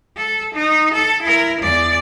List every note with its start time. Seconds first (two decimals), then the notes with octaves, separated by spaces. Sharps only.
0.16 A4
0.54 D#4
0.93 A4
1.22 E4 A#4
1.61 E2 D5